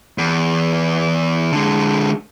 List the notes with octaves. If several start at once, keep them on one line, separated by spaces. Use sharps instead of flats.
E2
D3 G#3